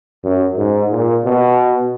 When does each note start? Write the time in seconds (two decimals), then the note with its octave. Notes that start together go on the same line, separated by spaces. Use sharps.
0.24 F#2
0.57 G#2
0.91 A#2
1.25 B2